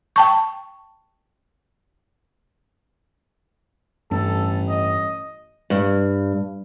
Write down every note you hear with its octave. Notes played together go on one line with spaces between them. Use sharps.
G5 A5 C#6
A1 G2 A4
D#5
G2